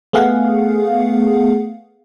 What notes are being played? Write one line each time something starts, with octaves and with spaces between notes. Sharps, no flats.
A3 B3 G#4 F5 F#5